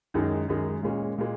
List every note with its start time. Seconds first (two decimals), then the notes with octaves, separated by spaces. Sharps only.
0.14 F#2 D#3 G#3 D#4
0.48 F#2 D#3 G#3 D#4
0.83 A#2 G#3 C#4
1.18 A#2 G#3